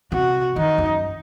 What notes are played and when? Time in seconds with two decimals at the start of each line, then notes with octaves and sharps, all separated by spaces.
0.12 C3 F#4
0.56 D#3 D#4
0.78 F#2